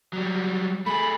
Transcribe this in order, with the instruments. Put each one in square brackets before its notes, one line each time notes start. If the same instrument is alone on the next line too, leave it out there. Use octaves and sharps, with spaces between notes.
[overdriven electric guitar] F#3 G3
[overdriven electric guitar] A3 G#4 [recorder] B5